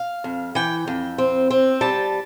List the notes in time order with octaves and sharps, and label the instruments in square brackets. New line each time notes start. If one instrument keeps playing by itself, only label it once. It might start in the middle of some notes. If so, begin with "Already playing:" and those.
Already playing: [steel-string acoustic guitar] F5
F2
E3 G5
F2
C4
C4
G3 A5